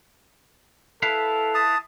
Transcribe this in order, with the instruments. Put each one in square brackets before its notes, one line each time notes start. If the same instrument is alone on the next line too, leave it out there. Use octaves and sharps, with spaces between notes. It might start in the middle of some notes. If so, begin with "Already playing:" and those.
[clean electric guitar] E4 B4 F5 [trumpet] A4
[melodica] A5 D#6